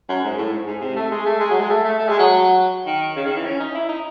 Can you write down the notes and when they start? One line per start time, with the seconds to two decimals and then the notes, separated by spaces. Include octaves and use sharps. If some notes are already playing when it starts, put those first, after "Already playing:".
0.09 F#2
0.23 G#2
0.38 A2
0.53 G#2
0.67 G#2
0.81 C3
0.96 A3
1.11 G#3
1.26 A3
1.40 G#3
1.50 F#3
1.60 G#3
1.70 A3
1.84 A3
1.99 A3
2.09 G#3
2.18 F#3
2.86 D#3
3.16 C#3
3.26 D#3
3.36 E3
3.45 C#4
3.60 D#4
3.75 E4
3.89 D#4